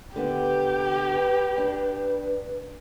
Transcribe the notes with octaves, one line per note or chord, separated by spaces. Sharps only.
D3 B3 G4
B4
D4